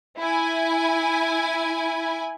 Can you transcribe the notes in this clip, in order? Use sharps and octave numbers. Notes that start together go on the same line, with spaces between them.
E4 G#5